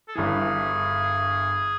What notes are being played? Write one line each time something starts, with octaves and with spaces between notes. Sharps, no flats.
A4
G1 G2 E3 G#4